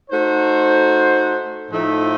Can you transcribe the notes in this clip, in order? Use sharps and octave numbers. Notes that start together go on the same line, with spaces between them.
A3 D#4 F#4 C5
A2 F3 A3 D#4